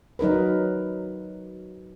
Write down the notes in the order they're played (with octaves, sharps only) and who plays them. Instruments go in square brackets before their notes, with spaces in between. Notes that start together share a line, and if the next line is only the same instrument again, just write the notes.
[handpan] F#3 D#4 A#4 B4